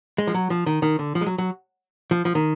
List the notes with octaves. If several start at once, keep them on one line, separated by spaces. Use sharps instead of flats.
G#3
F3
F#3
F3
D#3
D#3
D3
F3
G#3
F#3
F#3
F3
F3
D#3